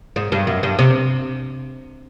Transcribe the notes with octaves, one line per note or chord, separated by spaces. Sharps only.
G#2
G2
F#2
G2
C3